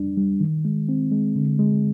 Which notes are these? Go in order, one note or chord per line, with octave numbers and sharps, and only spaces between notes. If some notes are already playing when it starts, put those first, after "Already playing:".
Already playing: F2 G3 D4
G3
D#3
G#3
C4
G#3
D3
G#3